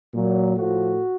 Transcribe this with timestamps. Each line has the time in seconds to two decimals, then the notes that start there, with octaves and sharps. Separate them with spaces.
0.13 A#2 F#3
0.56 A2 F3 F#4